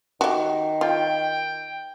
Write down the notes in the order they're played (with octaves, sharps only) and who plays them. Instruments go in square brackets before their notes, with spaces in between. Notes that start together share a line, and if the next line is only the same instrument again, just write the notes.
[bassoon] D#3 [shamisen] F#4 G4
[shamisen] F4 [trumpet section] G5